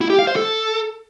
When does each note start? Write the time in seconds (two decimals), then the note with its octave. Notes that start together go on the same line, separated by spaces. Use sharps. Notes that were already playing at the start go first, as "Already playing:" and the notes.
0.01 E4
0.10 G4
0.19 F5
0.27 C5
0.36 A4